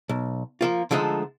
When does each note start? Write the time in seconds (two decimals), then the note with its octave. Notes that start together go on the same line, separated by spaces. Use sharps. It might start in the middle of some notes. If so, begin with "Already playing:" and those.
0.09 B1
0.61 F3 A#3 F4
0.91 D3 F3 G#3 A3 D#4